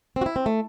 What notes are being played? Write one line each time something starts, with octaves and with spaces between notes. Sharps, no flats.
C4
F#4
E4
C4
A3